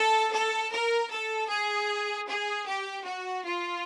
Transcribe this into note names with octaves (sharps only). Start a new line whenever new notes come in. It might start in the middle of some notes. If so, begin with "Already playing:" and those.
Already playing: A4
A4
A#4
A4
G#4
G#4
G4
F#4
F4